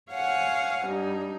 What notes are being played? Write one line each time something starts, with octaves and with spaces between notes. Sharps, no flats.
C#5 F5 F#5 G#5
G2 D#4